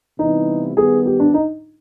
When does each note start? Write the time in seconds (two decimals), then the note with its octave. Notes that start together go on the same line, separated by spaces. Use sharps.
0.19 C3 E3 G3 B3 D#4 E4
0.76 D#3 G3 B3 G#4
1.06 G4
1.20 D4
1.34 D#4